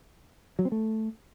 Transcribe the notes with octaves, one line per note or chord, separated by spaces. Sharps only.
F#3
C4
A3